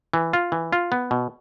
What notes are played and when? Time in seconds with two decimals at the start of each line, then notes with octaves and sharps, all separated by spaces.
0.13 E3
0.33 F4
0.52 E3
0.72 F4
0.92 B3
1.11 B2